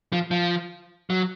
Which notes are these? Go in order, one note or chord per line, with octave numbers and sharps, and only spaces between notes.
F3
F3
F#3